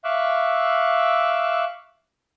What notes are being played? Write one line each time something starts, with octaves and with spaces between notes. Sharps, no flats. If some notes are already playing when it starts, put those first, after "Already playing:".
E5 F5 C#6 D6 E6 F#6